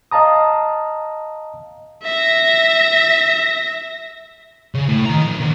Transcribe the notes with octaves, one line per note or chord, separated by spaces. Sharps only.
D#5 F5 A5 A#5 D#6
E5 A#6
C#3
A2
D#3 A#5
F3 A#3
D#3 D4